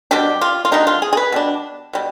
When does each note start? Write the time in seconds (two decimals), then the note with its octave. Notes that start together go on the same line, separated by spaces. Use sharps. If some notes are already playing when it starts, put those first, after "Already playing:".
0.11 B2 G3 D4 G4
0.41 F4
0.65 F4
0.72 B2 G3 D4 D#4
0.87 F4
1.02 G#4
1.13 G#4
1.17 B4
1.32 B2 G3 D4
1.93 B2 G3